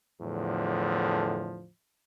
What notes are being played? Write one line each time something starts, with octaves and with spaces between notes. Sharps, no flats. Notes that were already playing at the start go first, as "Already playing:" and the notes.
E2 A2 D3 F3